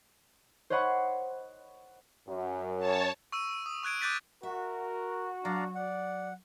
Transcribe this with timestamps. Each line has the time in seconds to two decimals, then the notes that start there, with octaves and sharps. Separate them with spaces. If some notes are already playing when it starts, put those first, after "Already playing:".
0.70 C5 C#5 D#5 F#5 B5 C#6
2.28 F#2
2.78 C#5 A5
3.32 C#6 E6 D#7
3.66 D#6
3.83 C#6 F#6 G#6 D7 D#7
4.01 D6 F#6 G6 A6 B6 D#7
4.43 F#4 A#4 E5
5.45 F#3 D4 D5 F5 A#5
5.75 D5 F#5